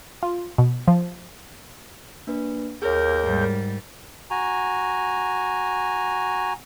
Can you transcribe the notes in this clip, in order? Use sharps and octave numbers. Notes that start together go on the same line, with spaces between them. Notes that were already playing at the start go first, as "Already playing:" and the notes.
F4
B2
F3
A#3 D4 B4
D#2 G#4 A#4 C#5 G6
G#2 G3
F#4 G#5 A#5